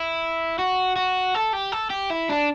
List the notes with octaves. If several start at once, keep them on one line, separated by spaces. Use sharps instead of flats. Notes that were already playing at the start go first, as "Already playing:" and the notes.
Already playing: E4
F#4
F#4
A4
G4
A4
G4
E4
D4